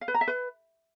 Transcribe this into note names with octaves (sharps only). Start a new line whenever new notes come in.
F5
B4
A#5
E5
B4